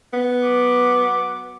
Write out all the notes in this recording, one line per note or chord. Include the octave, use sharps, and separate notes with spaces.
B3
F#3 D6